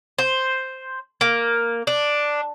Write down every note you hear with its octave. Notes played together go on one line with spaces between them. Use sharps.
C5
A#3
D4